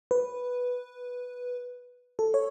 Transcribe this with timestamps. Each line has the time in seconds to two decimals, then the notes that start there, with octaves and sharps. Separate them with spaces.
0.11 B4
2.19 A4
2.34 C#5